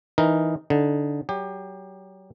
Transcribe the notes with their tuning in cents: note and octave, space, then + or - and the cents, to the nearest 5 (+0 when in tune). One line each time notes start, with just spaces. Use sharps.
E3 -5 D#4 +0 A#4 +5
D3 -15 D#4 +0
F#3 +30 G4 +25